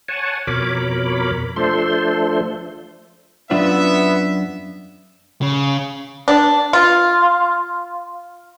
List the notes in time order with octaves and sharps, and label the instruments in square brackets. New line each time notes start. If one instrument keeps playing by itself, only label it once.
[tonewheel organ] C#5 F#5 G#5 A5
F2 B2 A#4 C#5 B5 D6
F3 A3 D4 A4 C5 C6
[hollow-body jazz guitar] F#2 D4 F4 [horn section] B3 E5
[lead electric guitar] C#3
[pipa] D4
F4